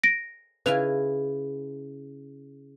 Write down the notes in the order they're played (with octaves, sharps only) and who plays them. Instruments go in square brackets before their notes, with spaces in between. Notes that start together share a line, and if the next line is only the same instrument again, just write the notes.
[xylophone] A#6 D7
[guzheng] C#3 E4 G#5 [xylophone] B4 F7